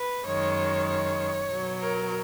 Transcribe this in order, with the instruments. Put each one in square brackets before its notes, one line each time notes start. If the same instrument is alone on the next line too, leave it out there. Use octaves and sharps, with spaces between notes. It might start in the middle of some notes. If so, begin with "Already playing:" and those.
Already playing: [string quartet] B4
F#2 D#3 G#3 C#5
C#5
B2 F#3
A#4